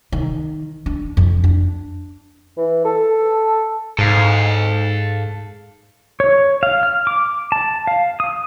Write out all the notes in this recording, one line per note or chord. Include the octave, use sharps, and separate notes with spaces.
D#3
D4
F2
D4
E3
A4
G#2 A4 F5
C#5
F5
F6
D6
A5
F5
D#6